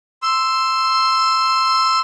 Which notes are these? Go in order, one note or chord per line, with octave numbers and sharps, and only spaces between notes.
C6 E6